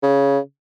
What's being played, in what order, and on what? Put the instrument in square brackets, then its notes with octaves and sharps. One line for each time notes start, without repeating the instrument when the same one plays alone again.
[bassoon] C#3